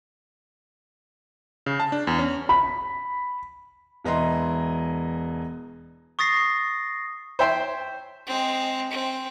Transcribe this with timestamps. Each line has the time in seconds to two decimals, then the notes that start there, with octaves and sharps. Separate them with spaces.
1.66 C#3
1.80 A5
1.92 D4
2.07 E2
2.19 C#4
2.49 B5
4.05 E1 E3 D#5 A#5 C6
6.19 C#6 D#6 A6 A#6 C7
7.39 C5 C#5 E5 G5 C6
8.27 G#3 C4
8.91 C4